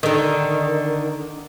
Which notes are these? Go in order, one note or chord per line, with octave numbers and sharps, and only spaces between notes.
D3 D#3